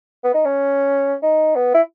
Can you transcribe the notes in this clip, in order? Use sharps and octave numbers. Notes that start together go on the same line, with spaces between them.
B3
D#4
C#4
D#4
B3
E4